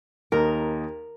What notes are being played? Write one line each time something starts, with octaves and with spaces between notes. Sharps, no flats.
D#2 D#4 A#4